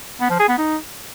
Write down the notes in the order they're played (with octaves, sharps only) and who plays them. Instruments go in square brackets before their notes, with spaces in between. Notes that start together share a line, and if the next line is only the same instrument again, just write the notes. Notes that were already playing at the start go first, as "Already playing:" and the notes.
[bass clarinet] B3
F3
G#4
B3
D#4